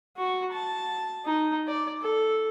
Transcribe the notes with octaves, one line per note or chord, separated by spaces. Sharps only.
F#4 C#6
A5
D#4
D5
A4